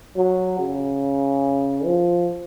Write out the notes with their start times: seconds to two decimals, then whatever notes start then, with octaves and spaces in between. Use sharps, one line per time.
0.17 F#3
0.59 C#3
1.85 F3